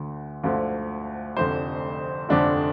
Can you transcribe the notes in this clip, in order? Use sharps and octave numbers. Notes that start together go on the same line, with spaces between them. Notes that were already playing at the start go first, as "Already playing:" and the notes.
Already playing: D2 D3
D2 D3 F3
F1 F2 D3 C5
F1 F2 D3 D4